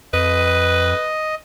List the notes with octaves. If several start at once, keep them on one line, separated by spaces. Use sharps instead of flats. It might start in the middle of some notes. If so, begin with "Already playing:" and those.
F2 B4 D#5